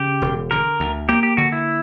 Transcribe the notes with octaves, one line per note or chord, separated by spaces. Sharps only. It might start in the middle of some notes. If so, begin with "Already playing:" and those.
Already playing: C#3 G4
E1
D3 A#4
D2
A#3 G4
G4
D3 F#4
E4